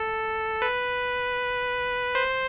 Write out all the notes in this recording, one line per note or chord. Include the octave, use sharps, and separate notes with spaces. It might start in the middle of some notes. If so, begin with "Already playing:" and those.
Already playing: A4
B4
C5